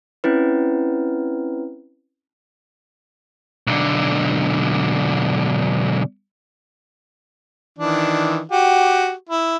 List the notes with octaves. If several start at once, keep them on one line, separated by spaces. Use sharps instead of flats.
C4 C#4 E4 B4
B1 D3
D#3 E3 D4
F#4 G4
E4